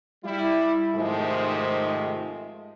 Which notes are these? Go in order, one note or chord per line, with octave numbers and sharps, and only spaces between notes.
G3 E4
G#2 C3 D#3 F3 G#3 A3